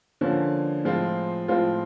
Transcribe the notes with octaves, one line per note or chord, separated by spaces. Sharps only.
D3 F3 A#3 C#4
A2 F3 G#3 C4 F4
A2 F3 G#3 C4 F4